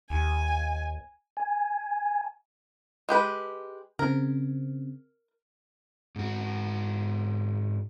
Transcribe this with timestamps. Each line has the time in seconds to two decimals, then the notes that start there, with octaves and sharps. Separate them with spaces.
0.10 D#2 G#5
1.37 G#5
3.09 G#3 G4 B4
3.99 C#3 C4 A#4
6.16 G#2 F#4